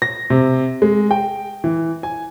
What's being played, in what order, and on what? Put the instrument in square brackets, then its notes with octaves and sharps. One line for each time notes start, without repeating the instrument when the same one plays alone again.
[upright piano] A#6
C3
G#3
G5
E3
G#5